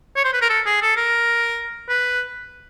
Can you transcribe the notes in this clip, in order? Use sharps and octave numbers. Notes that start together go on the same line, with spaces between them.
C#5
C5
B4
A#4
A4
G#4
A4
A#4
B4